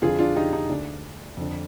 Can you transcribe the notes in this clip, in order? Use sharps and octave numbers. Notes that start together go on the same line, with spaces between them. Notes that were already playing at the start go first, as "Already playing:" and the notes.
F2 D3 F4 G#4
D4 F4
D#4 G4
D#4
D2 D3 D4
F2 D3